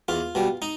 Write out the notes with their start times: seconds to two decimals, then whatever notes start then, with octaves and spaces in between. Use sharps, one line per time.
0.08 E2 F4
0.35 B2 G3
0.62 D#4